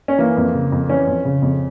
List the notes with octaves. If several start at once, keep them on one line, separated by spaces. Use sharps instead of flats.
C#4
E3 A#3
F2
C#3
F2
E3 C#4
F2
C#3
F2